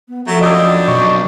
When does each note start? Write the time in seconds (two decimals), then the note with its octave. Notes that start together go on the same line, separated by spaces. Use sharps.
0.08 B3
0.27 F3 F#3 A3
0.41 F#2 D4 G4 D#5 D#6 E6
0.88 B1 D#5 C#6
1.11 C4